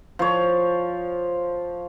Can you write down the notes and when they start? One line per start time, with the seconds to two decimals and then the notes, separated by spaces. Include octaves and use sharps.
0.19 F3 C#5